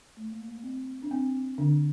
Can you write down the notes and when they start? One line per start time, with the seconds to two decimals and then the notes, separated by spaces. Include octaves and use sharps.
0.17 A3
0.32 A#3
0.48 A#3
0.63 C4
1.03 D4
1.11 C4
1.58 D3 D4